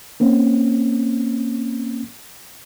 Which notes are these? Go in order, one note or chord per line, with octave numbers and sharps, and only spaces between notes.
A#3 C4 C#4